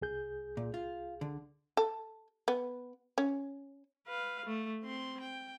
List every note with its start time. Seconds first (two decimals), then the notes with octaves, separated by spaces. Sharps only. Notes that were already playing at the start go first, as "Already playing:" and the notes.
0.02 C2 G#4 G6
0.57 A#2
0.74 F4
1.21 D3
1.77 A4
2.48 B3
3.18 C#4
4.07 B4 F5
4.45 A3
4.84 C4 C6
5.21 G5